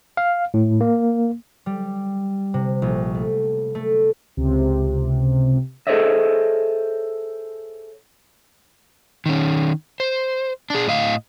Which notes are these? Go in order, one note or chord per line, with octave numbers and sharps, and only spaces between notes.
F5
A2
A#3
G3
C3
A#1
A3
A3
C#2 C3
G#4 A4 C5 C#5 D#5 E5
D#3 C#4
C5
D4 G#4
A2 D#5 F5